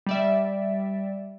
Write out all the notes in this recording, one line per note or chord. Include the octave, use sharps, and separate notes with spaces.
G3 D5 E5